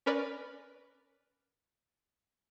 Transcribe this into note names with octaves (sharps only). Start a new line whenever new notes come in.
C#4 A#4 B4 D5